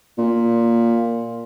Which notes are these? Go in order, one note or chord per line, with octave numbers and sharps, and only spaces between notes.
A#2